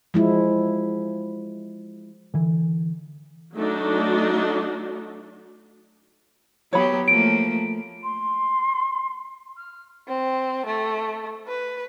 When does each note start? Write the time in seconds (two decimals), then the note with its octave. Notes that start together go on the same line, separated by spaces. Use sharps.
0.14 F3 G#3 E4
2.34 D3 E3
3.56 F#3 A3 D4 D#4 F#4
6.73 F#3 B3 G4 C#5 B5
7.08 F3 A3 A#3 D7
8.04 C6
9.57 F6
10.08 C4
10.66 A3
11.47 B4